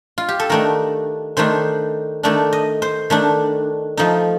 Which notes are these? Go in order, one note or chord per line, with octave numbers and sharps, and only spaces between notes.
F4
G4
A4
D#3 A3 D4 A#4
D#3 A3 D4 C5
D#3 A3 D4 D5
D#5
C5
D#3 A3 D4
F3 A3 D#4